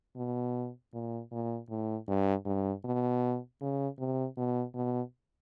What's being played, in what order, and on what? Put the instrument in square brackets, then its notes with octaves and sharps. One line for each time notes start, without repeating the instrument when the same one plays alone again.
[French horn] B2
A#2
A#2
A2
G2
G2
B2
C#3
C3
B2
B2